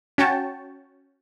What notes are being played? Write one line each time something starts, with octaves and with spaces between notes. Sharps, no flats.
C#4 F#4 C#5 G5 A5